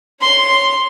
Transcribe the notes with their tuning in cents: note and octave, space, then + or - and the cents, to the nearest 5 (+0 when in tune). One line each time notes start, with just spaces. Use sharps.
C#5 +0 C6 +0